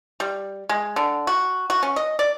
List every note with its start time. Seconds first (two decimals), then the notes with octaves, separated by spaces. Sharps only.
0.20 G3
0.69 G#3
0.96 D3
1.27 F#4
1.70 F#4
1.83 C#4
1.96 D#5
2.19 D5